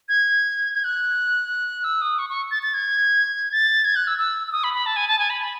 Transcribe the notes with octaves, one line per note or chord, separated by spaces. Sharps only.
G#6
G#6
F#6
E6
D#6
C#6
C#6
A6
A6
G#6
A6
G#6
F#6
E6
E6
E6
D#6
B5
B5
A5
G#5
A5
G#5
B5
B5